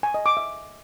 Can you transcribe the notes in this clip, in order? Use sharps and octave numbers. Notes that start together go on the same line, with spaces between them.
G#5
D#5
D6
E5